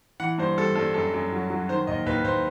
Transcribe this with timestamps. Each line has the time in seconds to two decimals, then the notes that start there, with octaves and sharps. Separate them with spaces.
0.20 E3 F#5
0.38 G2 C5
0.58 G3 A4
0.75 G2 A4
0.94 F#2 A4
1.14 F#2
1.32 F#3
1.50 F#3
1.69 D#3 C5
1.87 D#2 D#5
2.06 D#2 B4
2.24 D#2 C5